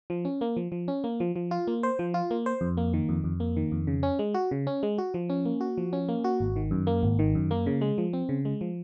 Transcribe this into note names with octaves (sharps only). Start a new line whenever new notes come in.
F3
C#4
A#3
F3
F3
C#4
A#3
F3
F3
F4
A#3
C5
F3
F4
A#3
C5
F2
A#3
D#3
F2
F2
A#3
D#3
F2
C#3
C#4
G#3
F#4
C#3
C#4
G#3
F#4
F3
C#4
A#3
F#4
F3
C#4
A#3
F#4
G#1
D#3
F#2
A#3
G#1
D#3
F#2
A#3
C#3
G#3
F3
C4
C#3
G#3
F3